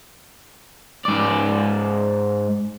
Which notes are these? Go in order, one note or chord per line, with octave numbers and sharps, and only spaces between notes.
G#2 D5